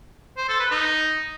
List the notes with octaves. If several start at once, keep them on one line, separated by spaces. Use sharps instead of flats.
C5
A4
B4
D#4